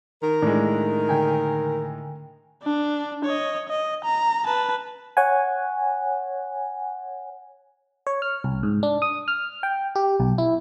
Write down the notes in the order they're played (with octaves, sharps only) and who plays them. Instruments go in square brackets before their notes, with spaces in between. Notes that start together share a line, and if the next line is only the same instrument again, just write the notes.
[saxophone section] D#3 A#4
[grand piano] A2 G#3 [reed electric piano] D4
[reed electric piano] D3 G5 G#5
[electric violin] D4
C#5 D#5
D#5
A#5
B4 A5
[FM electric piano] C#5 F#5 G#5
C#5
F6
C2
G#2
D4
D#6
F6
G5
G4
B1
E4